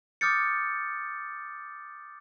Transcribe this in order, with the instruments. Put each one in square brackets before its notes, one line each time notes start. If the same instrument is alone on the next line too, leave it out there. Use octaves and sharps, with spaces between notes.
[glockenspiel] D6 D#6 F6 G6 A6 C#7